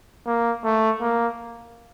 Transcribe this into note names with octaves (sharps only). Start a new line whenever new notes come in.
A#3
A3
A#3